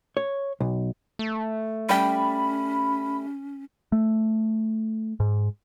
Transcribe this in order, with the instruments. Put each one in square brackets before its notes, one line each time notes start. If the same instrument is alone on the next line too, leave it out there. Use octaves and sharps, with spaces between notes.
[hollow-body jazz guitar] C#5
B1
[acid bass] A3
[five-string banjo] G3 G5 [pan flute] C#4 [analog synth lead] B5
[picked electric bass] A3
G#2